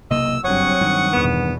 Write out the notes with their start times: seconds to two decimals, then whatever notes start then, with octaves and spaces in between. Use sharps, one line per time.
0.11 B1 C3 A#3 D#5 E6
0.44 F#1 G2 F#3 C4 C#5 F#5 C#6 D#6
0.81 G2 D#3
1.13 E2 B2 B3